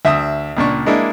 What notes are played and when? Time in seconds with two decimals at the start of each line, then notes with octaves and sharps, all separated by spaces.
0.05 D2 E5 D#6
0.57 C#2 A#2 D4 C#6
0.86 G#3 A#3 D4 E4